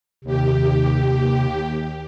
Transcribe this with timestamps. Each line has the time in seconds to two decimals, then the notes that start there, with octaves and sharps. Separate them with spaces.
0.24 D#2 C3 G4